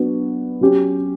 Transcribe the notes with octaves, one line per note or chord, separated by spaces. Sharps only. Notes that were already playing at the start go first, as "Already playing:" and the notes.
Already playing: F#3 B3 D4 F#4
F#3 C#4 G4